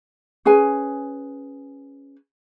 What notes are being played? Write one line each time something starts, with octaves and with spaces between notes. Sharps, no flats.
C#4 G#4 B4 G#5